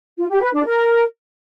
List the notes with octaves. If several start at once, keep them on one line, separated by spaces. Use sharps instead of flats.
F4
G4
B4
D4
A#4